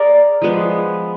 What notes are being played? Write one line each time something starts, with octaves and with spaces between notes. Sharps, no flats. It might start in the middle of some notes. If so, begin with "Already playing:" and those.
Already playing: G#4 A#4 D5
F3 G#3 B3